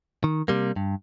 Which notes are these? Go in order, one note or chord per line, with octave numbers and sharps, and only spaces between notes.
D#3
C3 G3 A#3
G2